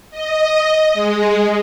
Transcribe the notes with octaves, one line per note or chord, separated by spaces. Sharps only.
D#5
G#3